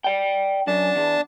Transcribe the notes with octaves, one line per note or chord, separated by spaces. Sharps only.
D5 G5
F#2 D4 A5
E2